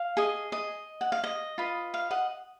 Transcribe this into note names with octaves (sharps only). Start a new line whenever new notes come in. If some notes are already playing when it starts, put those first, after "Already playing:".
Already playing: F5
G#4 D#5
D#5
F#5
F5
D#5
F4 B4 D#5
F5
D#5 F#5